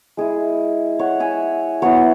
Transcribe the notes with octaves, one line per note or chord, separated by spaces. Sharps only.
G#3 E4 G#4
C#5 F#5
E5 G#5
F#3 B3 E4 C#5 F#5